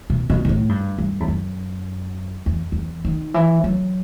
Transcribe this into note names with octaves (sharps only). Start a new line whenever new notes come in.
B2
B2
B2
A2
G2
G2
E2
F#2
E2
E2
D#3
E3
F#3